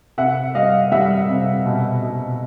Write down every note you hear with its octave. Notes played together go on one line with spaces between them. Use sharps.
C3 E5 F#5
G3 D#5 F5
G3 E5 F#5
C3
B2
B2